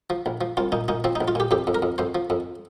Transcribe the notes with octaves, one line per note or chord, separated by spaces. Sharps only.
F3
A#1
F3
C2 F4
A#2 D#4
A#2 D#4
F3 C4
D#4
A#1
F4
A#2 G4
F2 G4
F2
A#4
F2
F2 C5
F3
F2